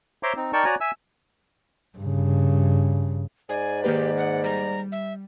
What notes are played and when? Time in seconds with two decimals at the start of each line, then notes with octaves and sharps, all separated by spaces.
0.23 C5 C#5 E5 A#5 C6 D6
0.36 C4 D#4
0.53 D#4 A#4 D5 G5 A5 C#6
0.65 F#4 C#5 D5 G#5 A#5
0.81 E5 G#5 E6
1.98 G2 C#3
3.49 G#2 D5 G#5
3.84 D#3 A#3 G4 B4
4.17 F#5
4.44 G3 A#5
4.92 E5